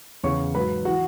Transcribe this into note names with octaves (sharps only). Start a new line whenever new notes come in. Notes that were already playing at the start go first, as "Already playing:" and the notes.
E2 C#3 E3 C#5 C#6
G#2 F#3 B4 B5
E3 F#4 F#5